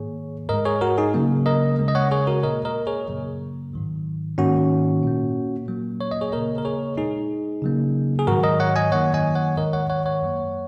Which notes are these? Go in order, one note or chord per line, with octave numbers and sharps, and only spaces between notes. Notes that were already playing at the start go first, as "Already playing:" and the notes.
Already playing: G#2 D#3 A#3 G#4 C#5
G#2 G#3 A#4 D#5
G#4 C#5
F#4 A#4
D#4 G#4
C#3 F#3 A#3
A#4 D#5
C#3 G#3
D#5
C#5 F#5
G#4 C#5
F#4 A#4
A#2 A#3 A#4 D#5
A#4 D#5
G#4 C#5
F#2 C#3 F#3 A#3
G#2 D#3 F#3
G#2 D#3 A#3 C#4 F#4
A#2 A#3
A#2 F#3 A#3
C#5
D#5
G#4 C#5
C#3 A#3 A#4 D#5
A#4
G#4 C#5
A#2 G#3 D#4 G#4
C#3 F#3 A#3
G#4
G#2 D#3 F#3 F#4 A#4
A#4 D#5
C#5 F#5
D#5 G#5
F#2 D#3 F#3 A#3 C#5 F#5
D#5 G#5
C#5 F#5
G#2 D#3 G#3 A#4 D#5
C#5 F#5
C#5 F#5
C#5 F#5
F#2 F#3 A#3